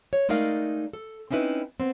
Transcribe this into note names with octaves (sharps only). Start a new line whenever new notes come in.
C#5
G#3 A3 D#4 A#4 D5 F5
A4
C4 C#4 D#4 E4 B4
B3 C4